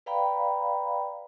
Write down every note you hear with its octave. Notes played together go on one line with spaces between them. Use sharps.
B4 D5 F5 G5 A#5 B5